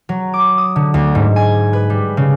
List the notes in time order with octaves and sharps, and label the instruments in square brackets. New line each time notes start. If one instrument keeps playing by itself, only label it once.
[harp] F#3
D6
D#6
D3
D2
G#2
G#5
B4
G3
C#3